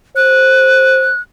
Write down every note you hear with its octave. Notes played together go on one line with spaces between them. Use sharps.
C5 F#6